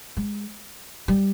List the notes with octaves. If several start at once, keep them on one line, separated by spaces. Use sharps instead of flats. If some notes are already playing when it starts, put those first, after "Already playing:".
G#3
G3